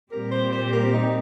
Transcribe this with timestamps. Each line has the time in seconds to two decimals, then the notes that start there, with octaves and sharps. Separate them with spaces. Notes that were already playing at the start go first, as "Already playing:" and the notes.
0.11 A#2 G3 C4 G4 A#4
0.32 C5
0.52 C5
0.73 A#4
0.94 D#4